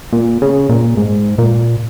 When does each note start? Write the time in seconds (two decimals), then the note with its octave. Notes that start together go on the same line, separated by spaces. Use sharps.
0.13 A#2
0.42 C#3
0.69 A#2
0.97 G#2
1.38 A#2